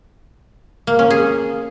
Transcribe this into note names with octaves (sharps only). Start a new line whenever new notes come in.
A#3
C#4
G#4